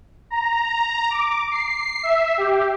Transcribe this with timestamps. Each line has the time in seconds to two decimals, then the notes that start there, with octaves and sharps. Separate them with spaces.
0.30 A#5
1.10 D6
1.52 C7
2.03 E5
2.38 G4